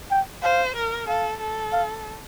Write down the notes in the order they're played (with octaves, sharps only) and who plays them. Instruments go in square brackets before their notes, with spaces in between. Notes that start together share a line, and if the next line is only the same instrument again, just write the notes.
[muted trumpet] G5
[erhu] C5 [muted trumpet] F5
[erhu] A#4
[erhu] A4 [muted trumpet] F5
[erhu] A4
[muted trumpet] F5